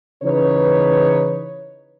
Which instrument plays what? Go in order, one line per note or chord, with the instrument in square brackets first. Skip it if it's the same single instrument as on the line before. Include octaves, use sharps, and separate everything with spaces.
[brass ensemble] C#3 E3 D#4 B4 C#5